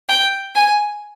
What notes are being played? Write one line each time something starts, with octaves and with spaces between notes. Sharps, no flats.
G5
G#5